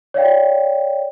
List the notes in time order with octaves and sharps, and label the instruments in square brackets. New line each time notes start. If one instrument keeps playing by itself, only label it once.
[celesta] C#5 D5 F5 G5